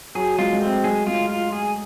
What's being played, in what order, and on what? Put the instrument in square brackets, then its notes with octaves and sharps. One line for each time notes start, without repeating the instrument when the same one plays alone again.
[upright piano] F#3 [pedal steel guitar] G#4
[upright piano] G#3 [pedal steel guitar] F4
[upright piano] G#3
[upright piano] A3 [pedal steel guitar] C4
[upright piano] G#3 [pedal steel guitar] G#4
[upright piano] G#3 [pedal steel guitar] F4
[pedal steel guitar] F4
G#4